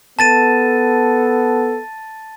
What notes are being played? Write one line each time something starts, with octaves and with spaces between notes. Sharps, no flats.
B3 A4 A5 A6 D#7